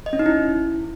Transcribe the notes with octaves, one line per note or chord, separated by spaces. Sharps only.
D#5
C#4
D#4
E4